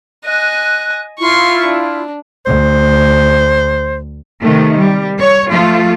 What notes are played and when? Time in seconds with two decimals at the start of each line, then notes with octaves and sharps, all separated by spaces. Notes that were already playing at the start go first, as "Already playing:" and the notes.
0.25 D#5 G#5 F#6
1.19 E4 F4 C6 C#6
1.66 D4
2.46 D2 C5
4.42 C3 D#3 A3
4.78 G3
5.19 C#5
5.51 F3 A3 F4